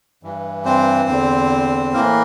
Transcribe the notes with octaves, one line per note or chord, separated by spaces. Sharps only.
G2 E3
C4 C5
E2 D3
A2 E3 A#3 A#4